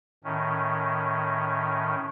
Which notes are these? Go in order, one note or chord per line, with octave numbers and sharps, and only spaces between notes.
A2 D#3 C#4